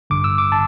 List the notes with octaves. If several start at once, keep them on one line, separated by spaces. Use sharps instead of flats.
A1 G2 D3 D6
E6
D6
A5